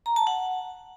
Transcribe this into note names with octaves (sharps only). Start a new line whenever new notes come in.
A#5
A5
F#5